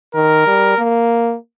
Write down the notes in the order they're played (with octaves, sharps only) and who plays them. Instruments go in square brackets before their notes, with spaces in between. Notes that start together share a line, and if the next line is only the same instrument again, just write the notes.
[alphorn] D#3 [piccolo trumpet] A#4
[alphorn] G3
A#3